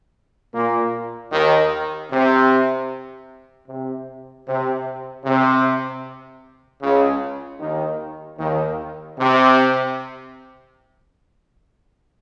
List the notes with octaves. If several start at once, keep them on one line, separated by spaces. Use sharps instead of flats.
A#2 A#3
D#2 D#3
C3
C3
C3
C3
C#2 C#3
D#2 D#3
D#2 D#3
C3